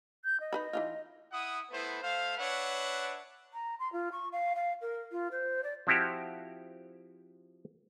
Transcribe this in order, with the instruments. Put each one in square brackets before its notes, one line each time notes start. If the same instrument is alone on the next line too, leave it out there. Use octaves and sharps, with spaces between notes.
[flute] G6
D#5
[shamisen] D#4 B4 B5
E3 D#4 F4
[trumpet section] E4 F#5 D#6
A3 B3 E4 B4 C5
A3 C5 F5
D4 B4 C#5 E5 F#5
[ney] A#5
C6
F4
C#6
F5
F5
A#4
F4
C5
D5
[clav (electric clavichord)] F3 C4 E4 F#4 G4